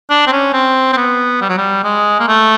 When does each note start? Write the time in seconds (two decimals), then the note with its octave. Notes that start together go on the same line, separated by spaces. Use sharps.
0.10 D4
0.27 C4
0.32 C#4
0.53 C4
0.93 C4
0.97 B3
1.41 G3
1.49 F#3
1.58 G3
1.84 G#3
2.20 A#3
2.28 A3